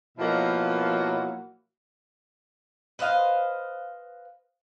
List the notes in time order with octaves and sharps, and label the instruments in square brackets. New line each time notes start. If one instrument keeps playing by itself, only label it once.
[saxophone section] B2 F3 F#3 A#3 E4 F#4
[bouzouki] B4 C5 D#5 F5